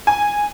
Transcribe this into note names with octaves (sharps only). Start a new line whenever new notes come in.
G#5